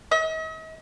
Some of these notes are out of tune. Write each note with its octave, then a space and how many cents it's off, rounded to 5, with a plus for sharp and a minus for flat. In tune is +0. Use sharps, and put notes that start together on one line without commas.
D#5 +45